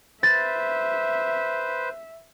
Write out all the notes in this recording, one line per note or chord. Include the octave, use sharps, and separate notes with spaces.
B4 C5 E5 A6